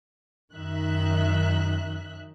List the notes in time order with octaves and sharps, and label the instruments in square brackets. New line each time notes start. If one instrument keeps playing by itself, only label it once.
[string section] F#2 D#3 D#4 E5 F#6